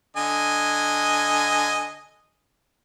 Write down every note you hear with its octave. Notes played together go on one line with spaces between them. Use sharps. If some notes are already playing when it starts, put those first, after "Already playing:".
D3 D#5 G#5